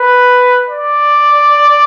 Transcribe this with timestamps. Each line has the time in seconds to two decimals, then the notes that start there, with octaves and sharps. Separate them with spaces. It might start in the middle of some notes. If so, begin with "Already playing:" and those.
Already playing: B4
0.70 D5